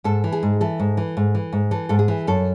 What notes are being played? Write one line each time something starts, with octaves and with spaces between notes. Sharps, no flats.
G#2 A4
E3
G#4
G#2
E3 A4
G#2
E3
G#2
E3
G#2
E3 A4
G#2 A4
G#4
E3
F#2 A4